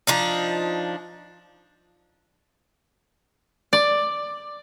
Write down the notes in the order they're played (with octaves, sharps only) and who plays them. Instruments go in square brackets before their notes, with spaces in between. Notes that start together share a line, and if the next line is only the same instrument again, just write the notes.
[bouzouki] F3 D4 D#4
[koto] D5